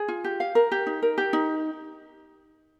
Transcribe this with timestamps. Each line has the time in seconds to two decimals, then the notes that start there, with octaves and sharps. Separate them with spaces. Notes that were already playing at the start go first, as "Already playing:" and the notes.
Already playing: G#4
0.08 F4
0.24 G4
0.40 F5
0.55 A#4
0.72 G4
0.87 D#4
1.02 A#4
1.18 G4
1.33 D#4